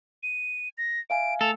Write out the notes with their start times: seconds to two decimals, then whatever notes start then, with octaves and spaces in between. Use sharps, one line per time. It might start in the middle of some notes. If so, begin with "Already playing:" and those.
0.23 D#7
0.78 A#6
1.10 E5 F5 G#5 D7
1.41 A3 A4 F7